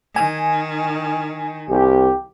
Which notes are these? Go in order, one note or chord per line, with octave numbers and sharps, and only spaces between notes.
D#3 G#5
C2 G4